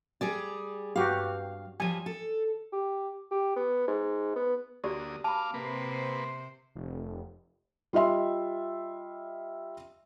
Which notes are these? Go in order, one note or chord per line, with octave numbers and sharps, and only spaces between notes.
G3 G#4 D5
G2 F#4 G4 F5
F3 G3 G#5
A4
G4
G4
B3
G#2
B3
D2 A#3 F#4 G4 D5 D#6
F5 A5 B5 D6
C3 A#3 B4 C5
F1
G3 F4 D#5 E5 C6